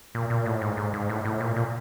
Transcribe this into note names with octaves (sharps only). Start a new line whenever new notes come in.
A#2
A#2
A2
G#2
G#2
G#2
A2
A2
A#2
A#2